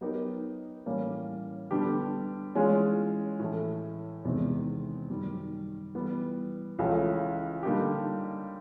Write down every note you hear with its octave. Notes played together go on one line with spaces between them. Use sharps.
F#3 B3 D#4 G4 A#4
A2 E3 G3 A#3 C#4
D3 G3 B3 D4 G4
E3 G#3 C#4 F4 G#4
A2 E3 A3
E2 C3 D#3 G#3 C4
F#2 D#3 G3
E3 G3 B3
C#2 C#3 E3 A3
D3 G3 A#3 D#4 G4